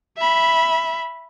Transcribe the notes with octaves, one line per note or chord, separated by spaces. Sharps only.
E5 B5